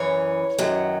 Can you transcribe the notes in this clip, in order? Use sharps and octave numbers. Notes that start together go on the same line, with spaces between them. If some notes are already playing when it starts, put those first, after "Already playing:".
Already playing: F#2 E3 C#5
F#2 D#3 F#3